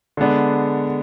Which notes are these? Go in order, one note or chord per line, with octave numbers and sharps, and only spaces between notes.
D3 G#3 B3 D4